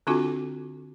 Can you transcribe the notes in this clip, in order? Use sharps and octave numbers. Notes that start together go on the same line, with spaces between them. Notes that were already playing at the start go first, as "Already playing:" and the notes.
D3 C4 D4 F4 F#4 A4